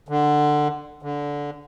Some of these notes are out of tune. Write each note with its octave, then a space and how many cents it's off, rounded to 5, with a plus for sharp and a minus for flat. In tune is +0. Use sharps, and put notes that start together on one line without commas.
D3 +15
D3 -15